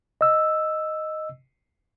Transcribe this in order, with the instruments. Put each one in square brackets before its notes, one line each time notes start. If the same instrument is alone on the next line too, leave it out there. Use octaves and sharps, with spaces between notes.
[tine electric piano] D#5 E6